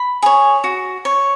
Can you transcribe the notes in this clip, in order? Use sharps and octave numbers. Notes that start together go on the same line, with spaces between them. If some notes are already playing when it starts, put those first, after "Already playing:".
Already playing: B5
G#4 C#5
F#4
C#5